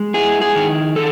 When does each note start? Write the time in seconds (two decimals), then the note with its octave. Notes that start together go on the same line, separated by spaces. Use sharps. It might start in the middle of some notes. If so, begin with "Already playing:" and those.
Already playing: G#3
0.14 E4 G#4
0.41 G#4
0.56 D#3
0.96 A4